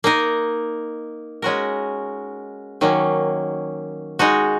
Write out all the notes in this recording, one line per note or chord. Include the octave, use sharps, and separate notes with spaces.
A#3 D#4 A#4
G#3 C#4 F#4 A#4
D#3 F#3 A#3 C#4
G#3 D#4 F#4